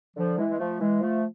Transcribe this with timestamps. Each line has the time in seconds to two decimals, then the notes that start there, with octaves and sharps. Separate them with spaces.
0.16 D3 F3
0.38 E3 G#3
0.50 G#3
0.59 F3 A3
0.80 E3 G#3
1.01 F3 A3